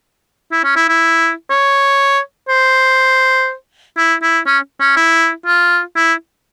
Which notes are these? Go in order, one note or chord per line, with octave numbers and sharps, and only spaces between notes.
E4
C#4
E4
E4
C#5
C5
E4
E4
C#4
C#4
E4
F4
E4